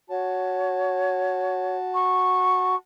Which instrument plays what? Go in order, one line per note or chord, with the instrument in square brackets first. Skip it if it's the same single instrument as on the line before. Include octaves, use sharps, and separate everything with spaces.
[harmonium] F#4 A5 [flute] C#5
[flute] C#6